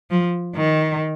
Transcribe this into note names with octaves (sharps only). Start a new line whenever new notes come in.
F3
D#3